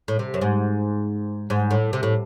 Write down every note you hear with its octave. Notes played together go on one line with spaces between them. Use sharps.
A2
C3
F#2
G#2
G#2
A2
C3
A2